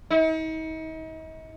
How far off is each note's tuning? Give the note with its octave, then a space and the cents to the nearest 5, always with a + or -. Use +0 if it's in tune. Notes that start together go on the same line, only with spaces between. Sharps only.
D#4 +40